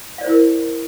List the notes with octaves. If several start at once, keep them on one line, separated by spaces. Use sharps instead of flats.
E4 A#4 C5 D5 F5